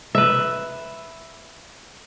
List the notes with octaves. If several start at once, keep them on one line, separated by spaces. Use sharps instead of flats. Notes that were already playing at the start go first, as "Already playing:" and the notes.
B4 E5